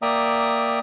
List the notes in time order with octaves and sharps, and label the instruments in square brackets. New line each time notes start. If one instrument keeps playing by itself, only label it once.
[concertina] A#3 D5 E5 G5 A#5 D#6